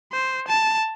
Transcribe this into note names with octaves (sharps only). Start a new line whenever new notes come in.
C5
A5